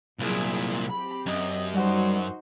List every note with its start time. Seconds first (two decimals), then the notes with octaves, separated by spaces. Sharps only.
0.19 C2 A#2 F#3 E4 G#4
0.89 C4 G4 B5
1.26 F#2 D#5
1.73 G3 D#4 F#4 C5